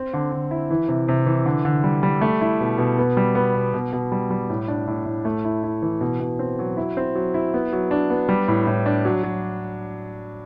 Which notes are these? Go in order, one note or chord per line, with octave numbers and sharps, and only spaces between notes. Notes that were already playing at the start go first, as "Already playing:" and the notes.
Already playing: C4
D3
D3
E4
E3
C3
C3
E3
D3
D3
G3
G3
A3
E4
B2
B2
B3
G3
B3
B2
B2
B2
G3
G3
A2
D4
A2
A2
A3
E4
E4
E3
B2
B2
C4
F#3
E4
C4
F#3
E4
B3
F#3
D4
B3
G3
A2
A2
D4
F#3
F#3